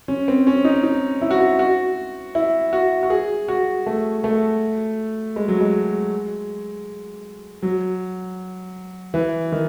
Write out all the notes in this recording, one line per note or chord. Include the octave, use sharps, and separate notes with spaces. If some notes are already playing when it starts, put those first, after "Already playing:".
C#4
C4
C#4
D#4
D#4
E4
F#4
E4
F#4
E4
F#4
F#4
G#4
F#4
A3
A3
G#3
F#3
G#3
F#3
E3
D#3